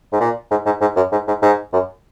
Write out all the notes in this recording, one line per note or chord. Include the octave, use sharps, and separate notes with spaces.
G#2
A#2
G#2
G#2
G#2
F#2
G#2
G#2
G#2
F#2